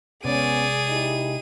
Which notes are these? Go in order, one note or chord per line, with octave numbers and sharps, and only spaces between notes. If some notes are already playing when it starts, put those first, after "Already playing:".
C3 G#3 B3 C#4 G#4 D5 D#7
D#4 E4 G4